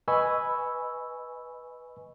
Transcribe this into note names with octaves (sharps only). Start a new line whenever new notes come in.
B4 D#5 G#5 B5 C#6 E6